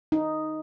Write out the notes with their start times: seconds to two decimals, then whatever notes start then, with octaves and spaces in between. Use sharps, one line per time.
0.12 D#4